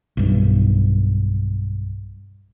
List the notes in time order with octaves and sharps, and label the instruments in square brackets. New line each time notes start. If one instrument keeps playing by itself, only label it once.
[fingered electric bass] B1 G2